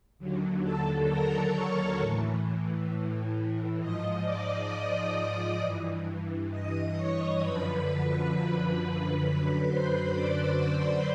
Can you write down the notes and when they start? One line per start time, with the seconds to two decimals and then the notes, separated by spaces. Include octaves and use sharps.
0.18 D#2 D3 F#3
0.63 A4 A5
1.08 A#4 A#5
1.53 C#5 C#6
1.99 A2 E3
3.80 G#2 F3 D#5 D#6
4.25 D5 D6
4.70 D#5 D#6
5.15 D5 D6
5.60 G2 E3
6.51 D#5 D#6
6.96 C#5 C#6
7.41 F#2 D3 F3 B4 B5
9.22 F#2 D3 F#3 B4 B5
9.68 C5 C6
10.12 D5 D6